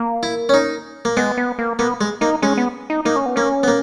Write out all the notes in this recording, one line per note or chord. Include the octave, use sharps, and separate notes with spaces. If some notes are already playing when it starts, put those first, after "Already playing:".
Already playing: A#3
E4
C#4
D#4
A#3
G#3 B3
B3
A#3
A#3 B3
G#3
A#3 D#4
G#3 C#4
B3
D#4
A#3 D#4
C#4
B3
A#3 C#4
B3
A#3